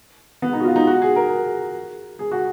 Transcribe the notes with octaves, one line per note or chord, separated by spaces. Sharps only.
B3
D#4
F#4
F4
D#4
F#4
G#4
A#4
G#4
F#4